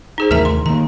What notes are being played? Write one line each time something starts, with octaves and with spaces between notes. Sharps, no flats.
D#4 G#4 C5
D#2 E3 A3 A#4 E5 A#5
C6
D#3 A#3 A#5